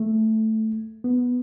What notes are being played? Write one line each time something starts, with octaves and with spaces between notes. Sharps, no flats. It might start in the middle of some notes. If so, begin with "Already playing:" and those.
Already playing: A3
B3